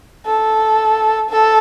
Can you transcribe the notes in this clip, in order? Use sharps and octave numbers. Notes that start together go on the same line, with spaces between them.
A4
A4